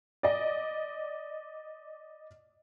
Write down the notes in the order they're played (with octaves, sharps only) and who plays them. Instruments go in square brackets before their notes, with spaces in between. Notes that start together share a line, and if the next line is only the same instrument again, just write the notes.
[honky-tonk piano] D5 D#5